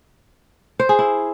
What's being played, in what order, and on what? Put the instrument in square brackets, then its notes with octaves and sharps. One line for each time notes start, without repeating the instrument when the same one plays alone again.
[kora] C5
G#4
E4